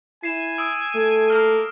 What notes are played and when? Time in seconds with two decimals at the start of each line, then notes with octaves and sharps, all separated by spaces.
0.23 E4 G#5 C7 E7
0.58 D#6 E6 D7
0.95 A3
1.30 A#3 F6